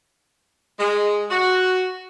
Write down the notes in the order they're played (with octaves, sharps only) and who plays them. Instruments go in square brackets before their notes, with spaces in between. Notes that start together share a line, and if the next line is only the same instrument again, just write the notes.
[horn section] G#3
F#4